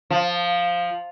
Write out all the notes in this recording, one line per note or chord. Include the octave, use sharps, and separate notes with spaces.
F3